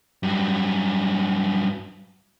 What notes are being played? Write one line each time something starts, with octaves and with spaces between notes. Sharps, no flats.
G2 F#3